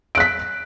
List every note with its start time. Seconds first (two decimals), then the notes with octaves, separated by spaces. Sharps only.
0.15 D7
0.18 F#6
0.20 B6